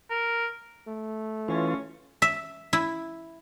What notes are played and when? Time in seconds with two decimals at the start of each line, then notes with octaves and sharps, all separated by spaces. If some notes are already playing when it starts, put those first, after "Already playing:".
0.10 A#4
0.88 A3
1.48 E3 C#4 F4
2.22 E5
2.73 E4